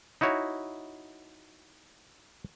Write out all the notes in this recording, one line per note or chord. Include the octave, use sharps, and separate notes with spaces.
D#4 E4 F#4 C#5